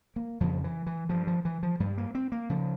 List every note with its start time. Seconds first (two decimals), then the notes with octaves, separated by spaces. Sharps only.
0.16 A#3
0.40 F2 C#3 F3
0.64 E3
0.87 E3
1.09 G2 F3
1.27 F3
1.45 E3
1.63 F3
1.80 G2 G3
1.97 A#3
2.15 C4
2.32 A#3
2.50 C#3 F3